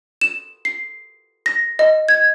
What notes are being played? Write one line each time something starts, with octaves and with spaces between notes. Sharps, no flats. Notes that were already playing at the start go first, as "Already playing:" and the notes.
E7
C7
A#6
D#5
G#6